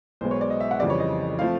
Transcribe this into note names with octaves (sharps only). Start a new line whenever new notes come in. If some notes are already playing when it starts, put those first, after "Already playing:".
B1 B2 G#3 B3 C5
C#5
D5
D#5
E5
F#5
F2 C#3 E3 G3 C4 D5
C#5
D#5
F3 A3 C4 F5